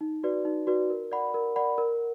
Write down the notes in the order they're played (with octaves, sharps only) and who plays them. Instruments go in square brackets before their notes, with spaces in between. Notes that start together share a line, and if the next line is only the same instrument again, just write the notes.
[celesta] D#4
F#4 B4 D5
D#4
F#4 B4 D5
A#4
D5 F#5 B5
A#4
D5 F#5 B5
A#4